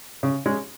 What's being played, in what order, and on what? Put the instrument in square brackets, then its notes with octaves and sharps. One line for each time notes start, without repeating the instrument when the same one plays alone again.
[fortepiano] C#3
G#3 C#4 G#4